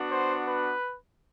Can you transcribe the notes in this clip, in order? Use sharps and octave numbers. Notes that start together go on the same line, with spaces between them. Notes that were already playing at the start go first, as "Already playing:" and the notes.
Already playing: B3 D4 F#4
C5
B4